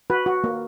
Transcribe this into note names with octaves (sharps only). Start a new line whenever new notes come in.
F#4 B4
F#4
A#3